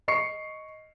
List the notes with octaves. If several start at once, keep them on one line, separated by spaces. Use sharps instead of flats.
D#5 C#6 C7 C#7